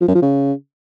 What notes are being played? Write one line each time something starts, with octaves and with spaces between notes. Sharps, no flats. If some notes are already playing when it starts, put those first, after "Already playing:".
F3
F#2
F3
C#3